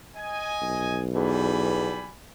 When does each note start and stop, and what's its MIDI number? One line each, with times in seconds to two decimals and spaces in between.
0.15 1.02 75
0.15 1.02 80
0.62 2.11 35
1.15 2.00 40
1.15 2.12 55
1.15 2.12 80
1.15 2.12 83